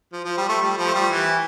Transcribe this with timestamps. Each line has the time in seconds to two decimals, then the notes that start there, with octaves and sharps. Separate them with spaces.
0.12 F3
0.25 F3
0.37 G3
0.49 A3
0.61 G3
0.77 F3
0.87 A3
0.94 G3
1.10 E3